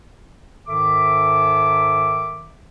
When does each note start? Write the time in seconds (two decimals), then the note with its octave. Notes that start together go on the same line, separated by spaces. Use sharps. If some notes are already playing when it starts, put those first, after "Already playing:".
0.67 G#2 D#3 A4 E5 D6